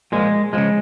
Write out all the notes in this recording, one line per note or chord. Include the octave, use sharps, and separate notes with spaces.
A#2 F3 G#3
C#3 F3 G#3